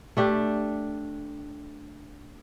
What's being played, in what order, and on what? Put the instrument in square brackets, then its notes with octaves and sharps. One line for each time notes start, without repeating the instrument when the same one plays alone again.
[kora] A3 D4 G4